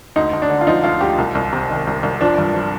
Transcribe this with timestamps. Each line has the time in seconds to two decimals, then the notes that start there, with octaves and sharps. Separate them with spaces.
0.16 D2 D#4
0.33 D2
0.42 D4
0.50 D3
0.61 F4
0.67 F3 D#4
0.83 D2 F4
1.01 D2 G4
1.18 C2
1.35 C2
1.53 C3
1.70 D#3
1.87 C2
2.03 C2
2.21 F3 D4
2.38 G2
2.54 F3